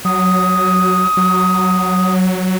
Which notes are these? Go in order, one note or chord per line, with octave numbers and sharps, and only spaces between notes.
F#3 D#6
F#3